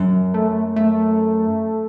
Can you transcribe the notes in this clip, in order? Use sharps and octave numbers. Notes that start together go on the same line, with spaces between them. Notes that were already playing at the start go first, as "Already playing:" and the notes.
Already playing: F#2
A3
A3